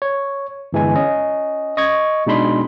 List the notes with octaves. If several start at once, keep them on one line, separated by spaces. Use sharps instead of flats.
C#5
G1 E3 G#3 G#5
C#4 D#5
D#5 C#6 G#6
B2 G#3 D4 D#4 B5 C6